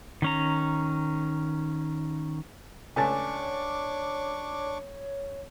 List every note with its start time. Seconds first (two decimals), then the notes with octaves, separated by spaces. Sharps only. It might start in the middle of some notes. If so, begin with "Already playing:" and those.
0.22 D#3 C#4 A#5
2.96 C#2 A3 D4 C#5 G#5 A5 C#6 D6